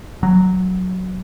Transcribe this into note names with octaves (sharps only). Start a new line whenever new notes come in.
F#3